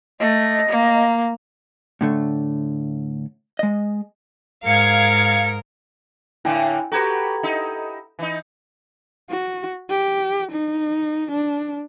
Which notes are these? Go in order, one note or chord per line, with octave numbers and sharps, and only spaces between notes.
A3 D#5
A#3
A2 D3 A3
G#3 D#5
G#2 A#4 F5 G#6 C#7
A2 D3 A#3 E4 G5 G#5
F#4 G4 A4 B4 A#5 G#6
D#4 E4
E3 D#4
F#4
G4
D#4
D4